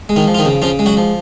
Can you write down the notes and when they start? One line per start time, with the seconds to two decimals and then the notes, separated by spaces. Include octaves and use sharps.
0.09 G#3
0.16 D#3 D#4
0.27 F3
0.34 F4
0.39 D#3 D#4
0.45 C#3
0.62 C#3 F3 F4
0.79 G#3
0.86 F#3 F#4
0.97 F3